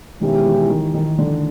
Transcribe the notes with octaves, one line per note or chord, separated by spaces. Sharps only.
B2 D#3 G#3 C#4 E4 G4
E3
D#3
D#3
D3